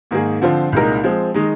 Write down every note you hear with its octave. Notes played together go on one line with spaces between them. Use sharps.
G#2 D#3 A#3 D#4 G#4
D3 F3 C4 F4 C5
C2 A#2 G#3 D#4 A#4
F3 G#3 C4
D#3 G#3 D#4